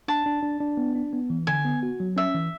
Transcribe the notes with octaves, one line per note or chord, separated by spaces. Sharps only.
D4 A5
D4
D4
D4
B3
D4
B3
E3
D3 G#5
B3
F#4
F#3
C#4 E5
E3